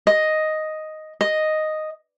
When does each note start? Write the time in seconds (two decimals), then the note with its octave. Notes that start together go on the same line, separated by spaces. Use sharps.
0.07 D#5
1.21 D#5